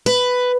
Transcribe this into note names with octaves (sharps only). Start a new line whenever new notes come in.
B4